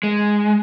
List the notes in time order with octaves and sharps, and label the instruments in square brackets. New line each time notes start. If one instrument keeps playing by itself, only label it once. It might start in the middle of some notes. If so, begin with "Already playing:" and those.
[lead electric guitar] G#3